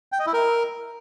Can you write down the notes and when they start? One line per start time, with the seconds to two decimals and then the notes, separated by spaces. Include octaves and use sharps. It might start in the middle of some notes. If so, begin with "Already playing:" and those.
0.12 G5
0.19 D#5
0.26 E4
0.33 A#4